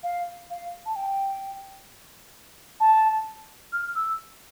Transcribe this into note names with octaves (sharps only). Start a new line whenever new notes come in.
F5
F5
A5
G5
A5
F6
E6